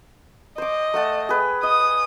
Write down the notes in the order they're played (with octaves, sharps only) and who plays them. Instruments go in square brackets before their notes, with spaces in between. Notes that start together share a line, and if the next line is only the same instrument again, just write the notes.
[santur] C5 D6 [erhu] D#5
[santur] A3 F#5 A5
G#4 B4 G5
[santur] D#5 [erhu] D#6